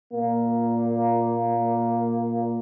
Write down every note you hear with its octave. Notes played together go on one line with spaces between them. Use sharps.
A#2 A#3